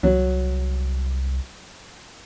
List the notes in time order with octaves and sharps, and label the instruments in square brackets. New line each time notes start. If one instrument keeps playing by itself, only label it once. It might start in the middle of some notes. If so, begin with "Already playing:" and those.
[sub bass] C2 [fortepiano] F#3